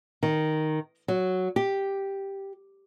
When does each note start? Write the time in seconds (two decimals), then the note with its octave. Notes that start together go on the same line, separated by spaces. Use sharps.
0.23 D#3
1.08 F#3
1.56 G4